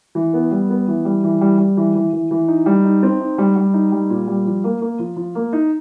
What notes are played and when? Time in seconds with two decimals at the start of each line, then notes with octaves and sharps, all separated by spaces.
0.15 E3
0.33 B3
0.51 G3
0.70 B3
0.88 E3
1.05 G3
1.24 E3
1.41 G3
1.59 G3
1.77 E3
1.95 E3
2.13 E3
2.31 E3
2.48 D#4
2.66 G3
2.84 D#4
3.03 C4
3.20 D#4
3.38 G3
3.56 G3
3.74 D#4
3.92 G3
4.10 A#2
4.28 G3
4.46 F3
4.64 A#3
4.81 A#3
4.99 F3
5.17 F3
5.35 A#3
5.53 D#4